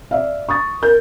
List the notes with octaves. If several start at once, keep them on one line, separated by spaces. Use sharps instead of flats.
D5 E5 F5
C#6 D#6 A6
A#4 G6